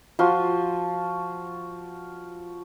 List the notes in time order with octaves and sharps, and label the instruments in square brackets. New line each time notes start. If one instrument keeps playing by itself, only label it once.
[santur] F3 F4 F#4 C6